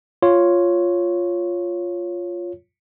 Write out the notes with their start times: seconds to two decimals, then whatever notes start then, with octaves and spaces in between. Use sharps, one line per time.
0.22 F4 C#5